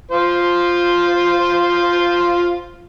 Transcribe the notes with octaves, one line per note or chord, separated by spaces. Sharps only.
F4 C5